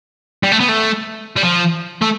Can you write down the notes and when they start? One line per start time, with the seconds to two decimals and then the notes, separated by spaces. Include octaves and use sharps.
0.43 G3
0.52 A3
0.60 B3
0.68 A3
1.36 G3
1.43 F3
2.02 A3